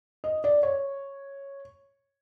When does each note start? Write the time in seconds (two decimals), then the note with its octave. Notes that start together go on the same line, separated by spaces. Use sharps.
0.24 D#5
0.44 D5
0.63 C#5